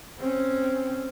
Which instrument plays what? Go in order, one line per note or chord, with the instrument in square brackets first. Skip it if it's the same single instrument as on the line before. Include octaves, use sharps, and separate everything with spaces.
[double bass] C4 C#4